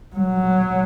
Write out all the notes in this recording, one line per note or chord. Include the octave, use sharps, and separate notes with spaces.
F#3